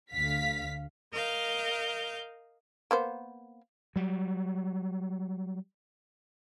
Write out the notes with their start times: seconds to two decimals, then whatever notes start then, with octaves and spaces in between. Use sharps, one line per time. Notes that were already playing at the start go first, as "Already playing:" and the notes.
0.12 D2 F5 B6
1.12 A#4 D#5 F5 G6
2.91 A#3 B3 C5
3.96 F#3 G3